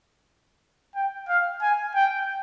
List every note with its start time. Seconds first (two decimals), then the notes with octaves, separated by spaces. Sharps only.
0.95 G5
1.28 F5
1.62 G#5
1.95 G5